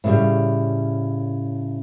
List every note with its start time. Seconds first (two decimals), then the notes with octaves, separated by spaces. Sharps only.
0.04 A2 C#3 G3